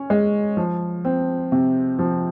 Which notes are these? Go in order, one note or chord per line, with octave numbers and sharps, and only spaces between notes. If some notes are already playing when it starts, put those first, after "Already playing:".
Already playing: C#4
G#3
F3
C4
C3
F3